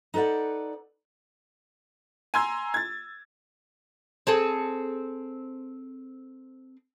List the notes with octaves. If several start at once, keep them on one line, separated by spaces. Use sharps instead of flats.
D#4 A4 B4 D5 F#5
G#5 A#5 C6 E6 G#6
G#6 A6
C4 G#4 A4